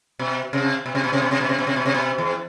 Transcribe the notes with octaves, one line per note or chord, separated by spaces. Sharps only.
B2
C3
B2
C3
B2
C3
B2
C3
B2
C3
B2
C3
B2
C3
B2
E2